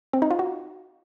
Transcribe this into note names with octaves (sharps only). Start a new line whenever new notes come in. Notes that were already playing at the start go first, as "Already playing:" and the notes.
C4
D#4
F4
F#4